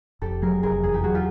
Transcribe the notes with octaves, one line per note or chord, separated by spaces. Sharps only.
F1 G4 A4
F#3 G#4 A#4
F1 G#4 A#4
E2 G#4
G4
F#3 F#4 G#4
F4 G4